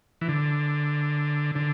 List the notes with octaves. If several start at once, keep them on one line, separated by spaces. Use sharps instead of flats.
E3
D3
D3